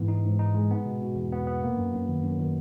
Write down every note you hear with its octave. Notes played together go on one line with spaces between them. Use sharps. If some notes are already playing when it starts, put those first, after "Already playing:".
Already playing: G#2 E3 B3
D#4
G#2
D#4
G#3
B3
B2
B2
E2
B3
B3
A#3
F#2
F#2
D#3
F#2
D#3